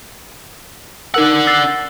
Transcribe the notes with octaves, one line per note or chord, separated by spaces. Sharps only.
D4 D#4 A#4 F#5 E6
E6 A6 C7